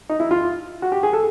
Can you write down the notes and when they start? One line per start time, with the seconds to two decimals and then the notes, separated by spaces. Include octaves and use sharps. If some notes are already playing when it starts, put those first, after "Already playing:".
0.09 D#4
0.20 E4
0.31 F4
0.82 F#4
0.92 G4
1.03 G#4
1.13 A4